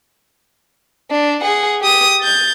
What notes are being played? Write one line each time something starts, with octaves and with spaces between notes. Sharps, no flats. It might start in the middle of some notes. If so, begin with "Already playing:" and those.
D4
G#4 F#5
G4 D#6
G6 A6